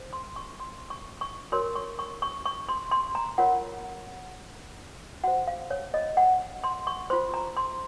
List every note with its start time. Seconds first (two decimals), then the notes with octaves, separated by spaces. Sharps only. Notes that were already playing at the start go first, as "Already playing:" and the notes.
Already playing: C5
0.13 C6
0.36 C#6
0.60 C6
0.90 C#6
1.21 C#6
1.52 F#4 A#4 C#5 C6
1.76 C#6
1.99 C#6
2.22 C#6
2.46 C#6
2.69 C6
2.91 C6
3.15 A#5
3.38 F4 A#4 C#5 F#5
5.24 F#4 C5 F#5
5.47 F5
5.71 C#5
5.94 D#5
6.17 F#5
6.64 C6
6.87 C#6
7.10 F4 C5 C6
7.34 A#5
7.57 C6